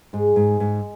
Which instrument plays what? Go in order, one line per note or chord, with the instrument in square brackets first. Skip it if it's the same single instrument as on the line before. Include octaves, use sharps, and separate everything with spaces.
[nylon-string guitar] G#2 [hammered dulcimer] G#3
[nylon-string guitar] G#2
G#2